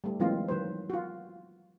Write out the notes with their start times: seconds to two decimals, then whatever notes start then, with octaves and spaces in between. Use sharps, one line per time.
0.04 G3 A3
0.20 E3 F#3 G#3 A#3 C4 F4
0.48 D#3 F#3 B4 C5
0.90 F4 F#4